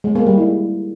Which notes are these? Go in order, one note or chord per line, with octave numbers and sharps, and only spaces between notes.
G#3
A#3
G3
E4